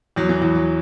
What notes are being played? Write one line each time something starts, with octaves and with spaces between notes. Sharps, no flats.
E2 F#3
E3
E2 F#3
F#3